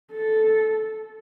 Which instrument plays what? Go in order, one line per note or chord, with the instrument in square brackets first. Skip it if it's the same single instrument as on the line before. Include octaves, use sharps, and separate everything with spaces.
[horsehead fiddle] A4